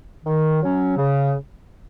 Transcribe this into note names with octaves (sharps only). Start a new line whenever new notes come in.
D#3
F#3 C#4
C#3